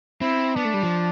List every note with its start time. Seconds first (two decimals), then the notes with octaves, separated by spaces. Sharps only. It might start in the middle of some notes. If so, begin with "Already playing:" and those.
0.21 C4 E4
0.56 B3 D4
0.65 A3
0.74 G3
0.83 F3